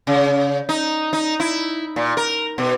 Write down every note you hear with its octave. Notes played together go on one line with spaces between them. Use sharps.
C#3
D#4
D#4
E4
A#2
A#4
B2